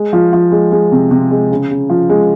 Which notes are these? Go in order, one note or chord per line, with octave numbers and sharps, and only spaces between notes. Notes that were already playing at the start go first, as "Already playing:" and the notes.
Already playing: G#3
F3
F3
G#3
G#3
C3
C3
G#3
C#3
C#3
F3
G#3